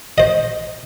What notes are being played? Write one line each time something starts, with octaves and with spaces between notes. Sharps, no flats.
C5 D#5